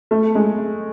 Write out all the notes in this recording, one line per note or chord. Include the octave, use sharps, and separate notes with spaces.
A3
G#3